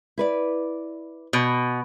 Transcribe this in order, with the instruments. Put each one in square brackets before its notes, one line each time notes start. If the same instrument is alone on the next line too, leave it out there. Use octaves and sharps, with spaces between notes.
[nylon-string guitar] E4 B4 D5
[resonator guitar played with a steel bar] B2